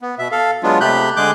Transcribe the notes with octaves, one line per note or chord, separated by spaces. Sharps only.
B3
B2 E5
A4 F5
F#3 G#3 B3 D4 F4
C3 A3 G4 B5 F#6 G6
D3 G#3 G#4 D6 F#6 G6